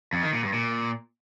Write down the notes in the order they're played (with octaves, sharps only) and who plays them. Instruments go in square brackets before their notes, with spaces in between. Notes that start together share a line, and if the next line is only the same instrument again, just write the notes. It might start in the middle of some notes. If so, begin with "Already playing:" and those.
[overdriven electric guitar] F2
D#3
A#2
G2
A#2